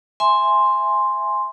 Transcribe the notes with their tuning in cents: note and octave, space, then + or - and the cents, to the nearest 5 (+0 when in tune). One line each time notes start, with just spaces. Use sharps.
E5 +0 G#5 +0 C6 +0